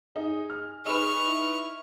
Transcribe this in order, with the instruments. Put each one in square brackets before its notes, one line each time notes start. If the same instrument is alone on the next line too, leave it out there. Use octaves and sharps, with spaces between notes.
[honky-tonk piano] D#4 [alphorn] G#4
[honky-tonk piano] F6
[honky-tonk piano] D#4 B4 [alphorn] G#4 [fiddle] C#6 F6
[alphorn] E4